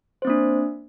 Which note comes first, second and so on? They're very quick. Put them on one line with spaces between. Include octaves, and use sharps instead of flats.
C5 C4 A#3 D4